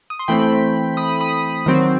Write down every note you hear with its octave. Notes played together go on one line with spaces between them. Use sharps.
D#6
C6
E3 A3 C4 G5 B5
B5 D#6
B5 D#6
D#3 F#3 C4